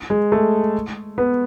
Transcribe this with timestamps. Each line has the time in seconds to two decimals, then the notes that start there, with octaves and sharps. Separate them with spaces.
0.10 G#3
0.32 A3
1.18 B3